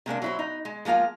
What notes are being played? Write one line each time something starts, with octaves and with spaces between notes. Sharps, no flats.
C3 G#3 A#3 D4
F#3 E4 C5
D#4
G#3
F3 G#3 A#3 F4 F5